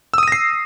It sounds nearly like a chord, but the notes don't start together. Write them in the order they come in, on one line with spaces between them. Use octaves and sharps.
E6 D#6 D#7 A#6 C7